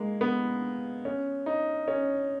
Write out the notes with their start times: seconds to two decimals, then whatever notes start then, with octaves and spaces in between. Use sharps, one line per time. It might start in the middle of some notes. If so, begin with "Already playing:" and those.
Already playing: G#3 A#3
0.21 B3
1.05 C#4
1.46 D#4
1.88 C#4